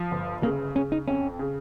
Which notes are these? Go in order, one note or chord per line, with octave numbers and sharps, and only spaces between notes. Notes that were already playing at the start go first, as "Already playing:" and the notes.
Already playing: F3
G1
C#3 A#3
C#3 C#4
D#4
F2 C#4
C#3